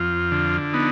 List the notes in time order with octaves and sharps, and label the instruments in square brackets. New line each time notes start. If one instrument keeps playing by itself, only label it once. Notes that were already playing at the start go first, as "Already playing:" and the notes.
Already playing: [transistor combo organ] F2 F4
D3
B3 D#4